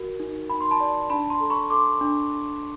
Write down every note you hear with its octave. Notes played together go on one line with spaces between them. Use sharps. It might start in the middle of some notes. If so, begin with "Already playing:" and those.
Already playing: F#4 A#4
D#4
D#4 B5
C6
A5 B5
D5
D4 A5 B5
A#5 C6
A4
B5 C#6
A4 C6 D6
D4